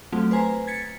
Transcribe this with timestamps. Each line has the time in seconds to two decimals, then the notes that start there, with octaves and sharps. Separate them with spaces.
0.12 F#3 A3 C4 F4
0.31 B4 C5 G#5 A#5
0.67 G#6 A6 B6 C#7